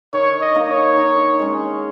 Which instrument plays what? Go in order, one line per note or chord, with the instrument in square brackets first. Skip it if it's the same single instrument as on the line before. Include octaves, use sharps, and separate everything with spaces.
[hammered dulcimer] D#3 [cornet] C#5
[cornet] D#5
[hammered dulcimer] A#3 D#4
[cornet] C#5
[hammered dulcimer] D#3
G#3 C#4